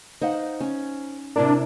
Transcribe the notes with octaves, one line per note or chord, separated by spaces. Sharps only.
D#4 C5 F5 F#5
C#4
C3 D4 E4 A#4